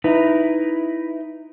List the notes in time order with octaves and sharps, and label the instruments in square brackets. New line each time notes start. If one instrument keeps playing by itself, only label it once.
[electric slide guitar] D#4 E4 B4